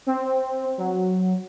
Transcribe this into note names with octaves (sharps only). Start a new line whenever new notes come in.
C4
F#3